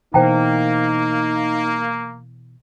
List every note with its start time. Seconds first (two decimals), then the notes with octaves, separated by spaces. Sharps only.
0.14 B2 E3 A#3 D#4 C5 G5 A#5